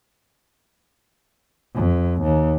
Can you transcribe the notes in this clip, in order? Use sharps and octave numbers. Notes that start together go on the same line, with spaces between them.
F2
D#2